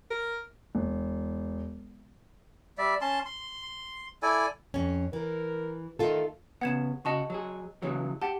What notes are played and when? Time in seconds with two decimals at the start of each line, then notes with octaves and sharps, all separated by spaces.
0.10 A#4
0.75 E1
2.78 G3 D5 E5
3.01 C#4 A5 C6
3.25 C6
4.22 E4 A4 D5 G#5
4.74 F2 C#4
5.13 E3 A#4
5.99 D#3 A3 F4 A4
6.61 C#3 B3 F#5 G#6 E7
7.05 C#3 F#4 D#5 A5 C#6
7.30 F#3 G#4
7.82 C#3 E3 F#3
8.22 G4 F#5 A5